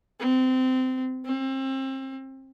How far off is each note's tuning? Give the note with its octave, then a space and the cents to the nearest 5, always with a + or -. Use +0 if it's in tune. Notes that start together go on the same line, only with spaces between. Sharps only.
C4 -20
C4 +30